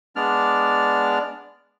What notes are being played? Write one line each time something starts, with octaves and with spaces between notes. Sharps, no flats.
G#3 B3 D4 D5 F6